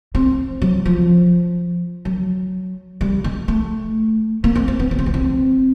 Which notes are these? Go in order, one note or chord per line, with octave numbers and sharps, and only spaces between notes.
C4
F#3
F3
F#3
G3
G#3
A3
A#3
C4
C4
B3
C#4
C4
B3
C4